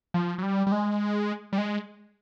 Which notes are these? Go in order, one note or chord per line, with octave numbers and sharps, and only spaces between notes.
F3
F#3
G3
G3
G#3
G3
G#3